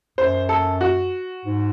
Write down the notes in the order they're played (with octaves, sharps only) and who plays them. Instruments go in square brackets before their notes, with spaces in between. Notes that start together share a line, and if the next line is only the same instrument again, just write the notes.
[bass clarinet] F#2 [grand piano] C5
[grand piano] A4
F#4
[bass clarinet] G#2